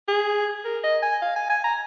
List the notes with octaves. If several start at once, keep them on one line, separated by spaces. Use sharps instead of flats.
G#4
A#4
D#5
G#5
F5
G#5
G#5
A#5